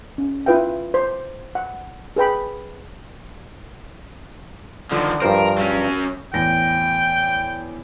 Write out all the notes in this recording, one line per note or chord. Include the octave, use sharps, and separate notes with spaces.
C#4
E4 F4 B4 F5 G5
C5
F#5
G#4 B4 G5 B5
D3 D#3 F3
G2 F3 A#4 C5
F#3 C#4
E2 A2 G5 A#6